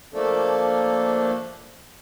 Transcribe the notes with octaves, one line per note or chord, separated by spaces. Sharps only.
F3 A3 A#3 D4 A4